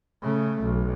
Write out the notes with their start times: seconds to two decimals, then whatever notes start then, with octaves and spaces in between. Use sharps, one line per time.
0.23 C#3 A3
0.62 B1